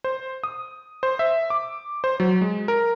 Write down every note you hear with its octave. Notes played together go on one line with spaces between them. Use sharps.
C5
D#6
C5
E5
D6
C5
F#3
G#3
A#4